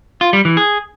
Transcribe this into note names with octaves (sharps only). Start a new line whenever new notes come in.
F4
G3
E3
G#4